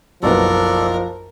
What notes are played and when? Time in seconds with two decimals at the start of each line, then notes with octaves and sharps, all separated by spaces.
0.23 F#1 B1 F3 B3 A4 A#4 D5